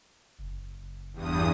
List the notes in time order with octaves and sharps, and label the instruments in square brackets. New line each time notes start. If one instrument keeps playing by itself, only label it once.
[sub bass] F#1
[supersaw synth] E2 G2 D#6